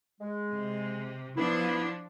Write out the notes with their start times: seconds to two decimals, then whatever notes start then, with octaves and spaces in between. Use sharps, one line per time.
0.21 G#3
0.52 C3
1.37 F3 B3 D4 E4